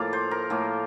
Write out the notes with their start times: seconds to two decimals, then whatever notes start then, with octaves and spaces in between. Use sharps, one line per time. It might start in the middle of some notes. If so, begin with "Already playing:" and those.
Already playing: A2 F3 A#3 D5 F5
0.13 C5
0.31 A#4
0.50 A2 F3 A#3